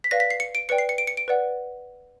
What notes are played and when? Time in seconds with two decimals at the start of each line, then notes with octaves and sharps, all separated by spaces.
0.04 B6
0.11 B4 D5 F5 A#6
0.20 B6
0.31 C7
0.40 C#7
0.55 D7
0.69 B4 D5 G5 C#7
0.78 C7
0.89 C#7
0.98 D7
1.07 C#7
1.17 D7
1.28 B4 D5 F#5